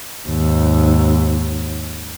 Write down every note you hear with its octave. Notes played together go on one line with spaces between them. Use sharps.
D#2 G#2